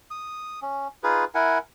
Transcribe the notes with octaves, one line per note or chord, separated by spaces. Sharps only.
D#6
C#4
D#4 F4 G#4 B4
E4 A#4 F#5 G#5